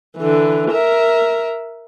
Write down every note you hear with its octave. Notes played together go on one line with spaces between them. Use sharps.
D3 E3
A#4 E5